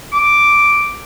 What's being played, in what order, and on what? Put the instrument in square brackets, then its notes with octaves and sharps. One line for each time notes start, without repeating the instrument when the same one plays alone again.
[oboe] D6